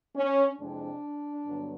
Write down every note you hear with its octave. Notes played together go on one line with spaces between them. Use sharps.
C#4
F2 C3 E3 G#3 C4 D4
G2 D3 F#3 B3